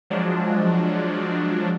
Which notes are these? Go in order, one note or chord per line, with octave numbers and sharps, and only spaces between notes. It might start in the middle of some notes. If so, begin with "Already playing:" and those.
F3 F#3 G#3 D4